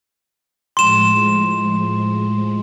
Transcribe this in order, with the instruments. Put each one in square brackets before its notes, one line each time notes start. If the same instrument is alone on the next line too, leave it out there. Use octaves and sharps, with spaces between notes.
[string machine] A2 F3 G#3 [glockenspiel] C6 E7